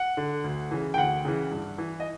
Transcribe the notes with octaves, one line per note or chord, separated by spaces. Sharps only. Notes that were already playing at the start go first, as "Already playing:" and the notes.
Already playing: F#5
D3
D2
C#3 E3
G5
D2 F#5
C#3 E3
G2
E3
D#5